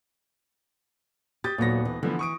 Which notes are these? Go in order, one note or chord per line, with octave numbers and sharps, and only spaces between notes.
G4 D#6 G6 A6
D#1 A#2 F#3 B3 A#6
E3
D3 E3 F3 B3
C#6 D#6 D7